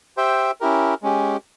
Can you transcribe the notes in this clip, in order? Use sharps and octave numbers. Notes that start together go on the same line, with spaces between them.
G4 C5 E5 G5
C#4 E4 G4 A#4
G#3 C#4 G4